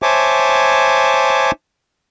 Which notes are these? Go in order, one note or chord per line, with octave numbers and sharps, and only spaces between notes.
C5 C#5 E5 G#5 A5 D6